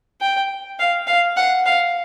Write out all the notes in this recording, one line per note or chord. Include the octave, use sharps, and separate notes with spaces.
G5
F5
F5
F#5
F5